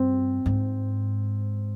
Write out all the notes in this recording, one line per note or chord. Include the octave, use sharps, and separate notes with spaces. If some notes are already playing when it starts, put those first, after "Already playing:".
Already playing: G2 C4
G#2